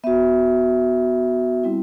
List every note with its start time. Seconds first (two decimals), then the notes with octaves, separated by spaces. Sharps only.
0.04 B3 F#4 E5
1.64 G3 C4 E4